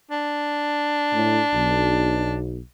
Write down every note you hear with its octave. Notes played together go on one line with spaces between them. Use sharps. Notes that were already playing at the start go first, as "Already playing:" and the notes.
D4
A2
B1